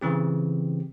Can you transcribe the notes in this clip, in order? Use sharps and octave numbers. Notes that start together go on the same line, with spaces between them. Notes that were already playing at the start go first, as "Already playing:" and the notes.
C#3 E3 C4 G4